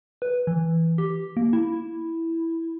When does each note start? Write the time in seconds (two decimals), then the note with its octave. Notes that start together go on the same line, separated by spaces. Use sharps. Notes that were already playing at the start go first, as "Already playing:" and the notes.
0.22 B4
0.47 E3
0.98 G4
1.37 A#3
1.53 E4